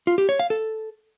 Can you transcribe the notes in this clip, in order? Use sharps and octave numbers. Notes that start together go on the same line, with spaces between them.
F4
G4
C#5
F5
A4